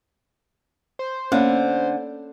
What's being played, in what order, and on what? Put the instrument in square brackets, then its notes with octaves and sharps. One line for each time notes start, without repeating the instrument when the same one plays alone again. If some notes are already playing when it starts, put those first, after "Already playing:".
[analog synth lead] C5
[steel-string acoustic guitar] D3 [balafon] A#3 B3 [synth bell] C#4 C#5 B5